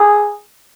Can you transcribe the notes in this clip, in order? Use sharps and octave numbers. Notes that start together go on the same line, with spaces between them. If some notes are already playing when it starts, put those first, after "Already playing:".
Already playing: G#4